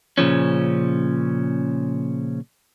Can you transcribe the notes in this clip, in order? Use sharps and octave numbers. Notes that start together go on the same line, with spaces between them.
A#2 C#3 F3 C#4